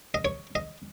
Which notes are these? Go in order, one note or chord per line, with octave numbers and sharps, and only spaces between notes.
D#5
C#5
D#5